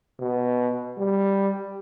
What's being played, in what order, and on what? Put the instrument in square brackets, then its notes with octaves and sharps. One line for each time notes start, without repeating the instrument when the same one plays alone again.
[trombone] B2
G3